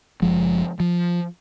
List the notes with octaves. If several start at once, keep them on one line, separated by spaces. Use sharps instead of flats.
F#1 F3 G#3
F3